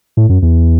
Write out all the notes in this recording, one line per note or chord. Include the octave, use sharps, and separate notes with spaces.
A2
F#2
E2